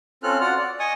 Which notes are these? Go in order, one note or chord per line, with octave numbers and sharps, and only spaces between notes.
C4 C#4 F4 A4 F6 F#6
F4 F#4 D5 F#5 F6
D5
D#5 G#5 C#6 D#6